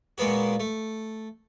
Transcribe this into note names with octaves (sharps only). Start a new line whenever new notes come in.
A#2 G#3 A#3 B3 F#4
A3